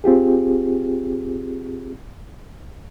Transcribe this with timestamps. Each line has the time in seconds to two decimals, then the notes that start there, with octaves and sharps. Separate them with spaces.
0.04 C4 F4 G4 G#4